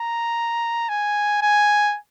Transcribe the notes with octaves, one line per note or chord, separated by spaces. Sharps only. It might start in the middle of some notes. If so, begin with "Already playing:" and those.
Already playing: A#5
G#5
G#5